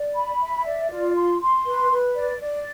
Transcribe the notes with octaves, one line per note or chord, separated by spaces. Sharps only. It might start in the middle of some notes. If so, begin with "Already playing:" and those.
Already playing: D5
B5
E5
D5
F4
C6
C6
B4
B4
D5
D5